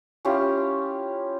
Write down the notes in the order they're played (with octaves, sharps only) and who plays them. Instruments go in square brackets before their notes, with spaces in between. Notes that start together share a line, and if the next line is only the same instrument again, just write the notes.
[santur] C#4 E4 F4 G4